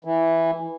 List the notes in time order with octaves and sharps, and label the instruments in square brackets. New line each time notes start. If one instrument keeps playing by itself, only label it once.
[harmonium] E3